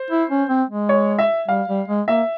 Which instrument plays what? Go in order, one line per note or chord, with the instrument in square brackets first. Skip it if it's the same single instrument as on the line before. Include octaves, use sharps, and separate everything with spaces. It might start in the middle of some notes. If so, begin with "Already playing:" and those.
Already playing: [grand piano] C5
[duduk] E4
C#4
C4
G#3
[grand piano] C#5
E5
[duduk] G3 [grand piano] F5
[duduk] G3
G#3
[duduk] A#3 [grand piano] E5